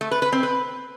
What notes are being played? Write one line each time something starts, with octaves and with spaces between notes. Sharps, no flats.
A3
B4
B4
C4
B4